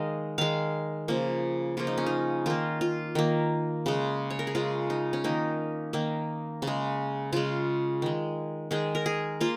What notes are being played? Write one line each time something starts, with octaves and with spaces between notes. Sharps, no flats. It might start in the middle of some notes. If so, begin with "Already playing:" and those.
Already playing: D#3 G#3 D#5 F5
D#3 G#3 F5
C#3 F3 A#3
C#3 F3 A#3 F4
D#4
C#4
D#4
D#3 A#3 F4
F4
D#3 A#3
C#3 G#3
C#5
A#4
G#4
C#3 G#3 F4
D#4
C#4
D#3 A#3 D#4
D#3 A#3
C#3
G#3
C#3 G#3 F4
D#3 G#3
D#3 G#3 G#4
A#4
G#4
A#3 F4